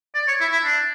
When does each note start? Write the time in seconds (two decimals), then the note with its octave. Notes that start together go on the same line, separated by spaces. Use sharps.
0.15 D5
0.28 C#5
0.40 E4
0.52 E4
0.64 D4